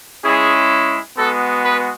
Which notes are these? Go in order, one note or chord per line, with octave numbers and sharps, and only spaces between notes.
G#3 C#4 E4 G#4
G#3 B3 F#4 A4
B4